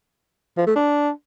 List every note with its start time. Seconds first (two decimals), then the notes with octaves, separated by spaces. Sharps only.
0.57 F3
0.67 A3
0.76 D4